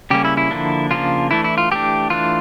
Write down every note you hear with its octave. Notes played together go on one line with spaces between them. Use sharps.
C#3 G3 A#3 C#4 G4
E4
E4
D3 F3 A#3 D4
C#3 F3 A#3 D4 F4
E3 A3 D4 E4
E4
F4
E3 A3 D4 G4
E3 A3 D4 F4